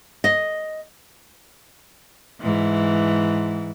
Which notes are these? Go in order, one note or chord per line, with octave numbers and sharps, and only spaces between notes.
D#5
G#2 E3